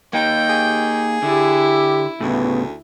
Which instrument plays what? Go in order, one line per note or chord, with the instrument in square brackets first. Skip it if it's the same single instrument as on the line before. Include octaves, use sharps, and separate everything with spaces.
[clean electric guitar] A#3 D#4 [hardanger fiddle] G5
[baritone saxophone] G#4
[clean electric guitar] D3 [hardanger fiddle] E4 [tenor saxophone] G4
[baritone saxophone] D2 [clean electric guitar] A2 C#3 [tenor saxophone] B3